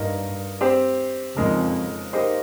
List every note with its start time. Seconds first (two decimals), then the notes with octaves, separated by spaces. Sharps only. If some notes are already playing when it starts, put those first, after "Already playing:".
Already playing: G2 A#3 D#4 A#4 D#5
0.61 C4 G4 C5
1.37 F2 C#3 G#3 D#4 A#4
2.13 A#3 D#4 G4 C5 D#5